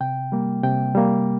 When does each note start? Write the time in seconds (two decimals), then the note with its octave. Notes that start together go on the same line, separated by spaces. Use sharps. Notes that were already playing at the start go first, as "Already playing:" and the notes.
0.01 C3 G5
0.32 G3 A#3
0.63 C3 G5
0.95 G3 A#3